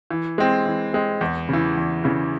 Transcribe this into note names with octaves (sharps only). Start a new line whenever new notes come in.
E3
G#3 C4
E3
G#3 C4
E2
C#3 E3
E2
C#3 E3